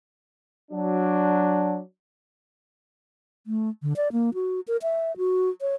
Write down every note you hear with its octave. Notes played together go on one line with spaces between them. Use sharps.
F#3 D4
A3
D3
D5
A#3
F#4
A#4
E5
F#4
C#5